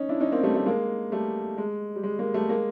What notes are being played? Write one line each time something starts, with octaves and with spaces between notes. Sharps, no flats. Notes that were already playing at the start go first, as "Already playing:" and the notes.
Already playing: C#4 D#4
D4 E4
C#4 D#4
A#3 C4
G3 A3
G3 A3
G#3 A#3
G3 A3
G#3
G3
G#3
G#3 A#3
G3 A3
G#3 A#3